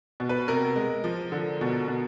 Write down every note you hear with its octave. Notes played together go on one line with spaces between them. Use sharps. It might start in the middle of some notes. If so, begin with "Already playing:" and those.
B2
B4
C3 A#4
G#3
F3
D3
B2
B2